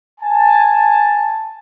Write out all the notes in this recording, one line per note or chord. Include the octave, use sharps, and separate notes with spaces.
G#5 A5